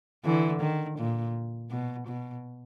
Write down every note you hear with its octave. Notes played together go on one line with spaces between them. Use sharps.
D3 E3
D#3
A#2
B2
B2